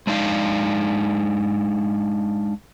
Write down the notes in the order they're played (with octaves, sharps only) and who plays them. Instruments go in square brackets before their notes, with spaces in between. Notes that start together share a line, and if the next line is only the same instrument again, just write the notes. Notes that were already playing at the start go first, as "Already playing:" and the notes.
[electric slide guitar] G#3 D4 D#4 F5